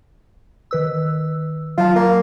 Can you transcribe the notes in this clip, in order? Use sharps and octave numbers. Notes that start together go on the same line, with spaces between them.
D#3 B4 E6
F#3 F4 A5
A#3